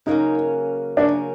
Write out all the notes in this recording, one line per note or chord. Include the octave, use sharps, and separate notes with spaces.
C#3 F#3 A#3 C#4 D#4
C#3 F#3 A#3 C#4 D4